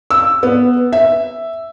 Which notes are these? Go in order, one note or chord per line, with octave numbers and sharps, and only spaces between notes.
E6
B3
E5